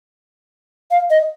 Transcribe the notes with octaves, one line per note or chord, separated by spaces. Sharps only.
F5
D#5